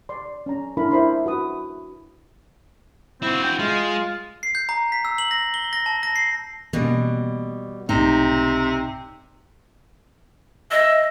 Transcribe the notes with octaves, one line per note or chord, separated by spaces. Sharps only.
D5 C6
C#4 A#5
D4 E4 A#4 B5
E4 C5 B5 C6
F#4 B4 D#6
C4 E4 F#4
G5
G#3 F4
C7
G6
A#5
B6
E6
F#7
A#6
G7
A#6
A5
A#6
C7
B2 E3 G3 A#3 C#4
B1 G#2 C3 A3 D#4
D#5 E5